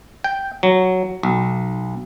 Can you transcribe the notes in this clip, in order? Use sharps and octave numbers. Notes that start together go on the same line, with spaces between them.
G5
F#3
B1